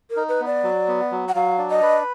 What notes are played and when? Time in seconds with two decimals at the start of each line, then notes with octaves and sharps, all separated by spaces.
0.10 A#4
0.16 D#4
0.29 B4
0.41 B3
0.46 D5
0.63 F#3
0.88 B3
1.11 F#3
1.29 F#5
1.35 F#3 F5
1.58 D4
1.70 D#5
1.82 B4